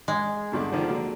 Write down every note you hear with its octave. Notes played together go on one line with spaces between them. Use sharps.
G#3
E2 G2 D3
D3 D#3 F3
D3 F#3 A#3